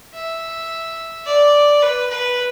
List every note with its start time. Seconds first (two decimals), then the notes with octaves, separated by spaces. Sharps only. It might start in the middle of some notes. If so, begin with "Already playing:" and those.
0.14 E5
1.26 D5
1.82 B4
2.10 B4